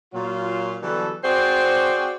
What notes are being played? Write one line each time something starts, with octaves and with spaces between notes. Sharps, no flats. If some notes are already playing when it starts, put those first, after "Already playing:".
A#2 F#3 F4
D3 E3 F#3 G3 B3 A4
C4 F#4 G#4 C5 D5